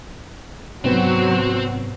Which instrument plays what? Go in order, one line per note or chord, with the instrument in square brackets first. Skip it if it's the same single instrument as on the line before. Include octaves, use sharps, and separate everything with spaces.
[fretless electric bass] G#2 C3 B3 [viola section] F#3 F#4 [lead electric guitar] C4